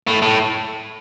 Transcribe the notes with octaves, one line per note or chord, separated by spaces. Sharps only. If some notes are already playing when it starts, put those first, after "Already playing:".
A2
A2